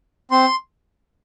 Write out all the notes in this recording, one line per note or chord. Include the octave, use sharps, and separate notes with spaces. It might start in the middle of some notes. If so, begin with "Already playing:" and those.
C4 C6